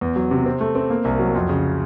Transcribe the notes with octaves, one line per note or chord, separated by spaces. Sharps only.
E2
F#3
C3
C4
A3
C4
A#3
C2
F#3
F2
C#3